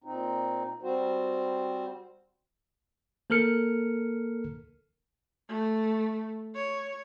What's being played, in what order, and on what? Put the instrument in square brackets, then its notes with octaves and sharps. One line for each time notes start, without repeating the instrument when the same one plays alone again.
[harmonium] A#2 C4 D#4
G3 C4 F#4 C5
[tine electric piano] A#3 A4 A#4 F6 C#7
[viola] A3
C#5